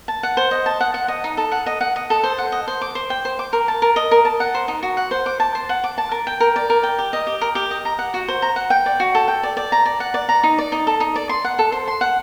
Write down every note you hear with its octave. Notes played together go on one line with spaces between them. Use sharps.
A5
F#5
C5
D#5
A5
F#5
F#5
D#5
D#4
A4
F#5
D#5
F#5
D#5
A4
C5
F#5
D#5
C5
D6
C5
G5
C5
D6
A#4
A5
A#4
D#5
A#4
A5
F#5
C5
D#4
F#4
F#5
C5
D6
A5
C5
F#5
D6
A5
A#4
G5
A#4
D5
A#4
G5
G4
D#5
G4
A#4
G4
D#5
A#5
F#5
F#4
C5
A#5
F#5
G5
D5
F#4
A4
G5
D5
D5
A#5
D5
F#5
D5
A#5
D#4
D5
D#4
A4
D#4
D5
C6
F#5
A4
C5
C6
F#5